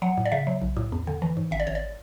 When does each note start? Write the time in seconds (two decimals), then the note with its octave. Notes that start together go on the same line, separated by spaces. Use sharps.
0.02 F#3 F#5
0.18 A2
0.26 D5
0.32 C#3 E5
0.47 F#3
0.62 B1
0.77 A2
0.92 E2
1.07 D3
1.22 E3
1.37 G#2
1.51 G#1 E5
1.60 D5
1.67 G#1 C#5
1.75 D5